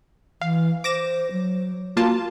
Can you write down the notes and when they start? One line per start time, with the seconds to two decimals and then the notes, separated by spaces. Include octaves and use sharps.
0.41 E3 F5
0.84 C5 D6 A#6 E7
1.32 F#3
1.97 A#3 F4 F#4 A5